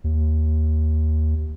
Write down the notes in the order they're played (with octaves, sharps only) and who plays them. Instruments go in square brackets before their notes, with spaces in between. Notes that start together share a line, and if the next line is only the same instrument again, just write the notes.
[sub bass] D#2